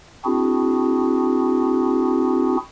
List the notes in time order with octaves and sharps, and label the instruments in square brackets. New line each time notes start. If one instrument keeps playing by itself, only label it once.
[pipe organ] C4 D4 E4 F#4 G#4